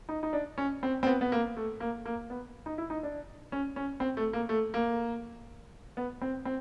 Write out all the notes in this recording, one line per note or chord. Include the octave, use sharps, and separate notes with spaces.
D#4
D#4
D4
C#4
C4
C4
B3
B3
A#3
A3
A#3
A#3
B3
D#4
E4
D#4
D4
C#4
C#4
C4
A3
A#3
A3
A#3
B3
C4
C4